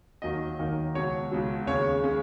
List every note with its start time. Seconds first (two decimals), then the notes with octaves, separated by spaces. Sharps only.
0.22 D#2 D#3 F#3 A#3 D#4 D#5
0.59 D#2 D#3 F#3 A#3 D#4
0.94 C#2 B2 F#3 C#5
1.31 C#2 B2 F#3
1.66 D#2 C#3 G#3 C#4 C#5
2.04 C#3 G#3 C#4